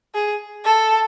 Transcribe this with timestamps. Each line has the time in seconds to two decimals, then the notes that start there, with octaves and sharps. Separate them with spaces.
0.14 G#4
0.64 A4